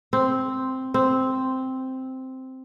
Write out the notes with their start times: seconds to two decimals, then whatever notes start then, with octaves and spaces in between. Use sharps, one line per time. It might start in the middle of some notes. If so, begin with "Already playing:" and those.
0.13 C4
0.94 C4